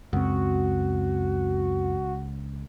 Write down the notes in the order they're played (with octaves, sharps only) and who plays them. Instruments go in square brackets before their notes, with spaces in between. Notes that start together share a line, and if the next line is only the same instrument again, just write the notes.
[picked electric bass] C#2 [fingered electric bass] F#2 C4 [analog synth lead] F#4